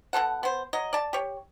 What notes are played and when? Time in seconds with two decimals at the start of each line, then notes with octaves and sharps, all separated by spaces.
0.13 B2 C4 A4 F#5
0.43 B3 C5
0.73 F#3 D#5
0.93 D5 A5
1.13 G4 C#5